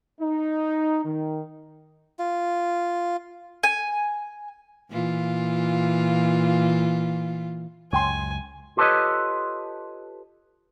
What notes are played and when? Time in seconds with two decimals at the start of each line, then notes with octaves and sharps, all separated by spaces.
0.20 D#4
1.05 D#3
2.19 F4
3.63 G#5
4.90 A#2 E3 F4
7.93 C#2 F#2 C#5 G5 G#5 C6
8.77 F4 G4 A4 B4 C#5 D#5